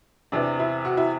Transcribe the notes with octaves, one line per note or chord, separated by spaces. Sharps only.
E2 C3 E3 D4
E4
F#4
E4